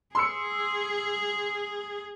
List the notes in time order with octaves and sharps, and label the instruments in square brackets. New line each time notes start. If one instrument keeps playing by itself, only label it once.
[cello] G#4 [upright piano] C6 E6 C#7